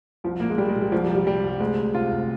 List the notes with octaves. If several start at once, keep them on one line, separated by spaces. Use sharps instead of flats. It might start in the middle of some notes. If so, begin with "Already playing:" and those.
C2 F3
A#2 A#3
G#3
A#2 G3
G#3
A#2
G3
C2 F3
G3
C3
G3
C3 G3
C2
D2 G#3
D2
C3 F4
D2